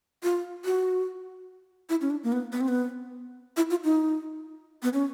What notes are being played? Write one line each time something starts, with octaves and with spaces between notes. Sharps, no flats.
F4
F#4
E4
C#4
D4
A#3
B3
B3
C4
B3
E4
F4
D#4
B3
C#4